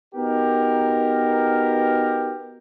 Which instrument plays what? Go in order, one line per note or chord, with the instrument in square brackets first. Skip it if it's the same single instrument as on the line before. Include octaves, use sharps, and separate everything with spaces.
[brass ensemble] B3 D#4 F#4 G4 A#4